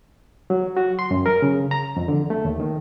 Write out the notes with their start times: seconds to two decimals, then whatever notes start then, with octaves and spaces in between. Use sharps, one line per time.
0.50 F#3
0.77 F#4
0.99 C6
1.11 F#2
1.26 A#4
1.42 C#3
1.71 A#5
1.97 F2
2.08 D3
2.30 A3
2.45 D#2
2.60 D#3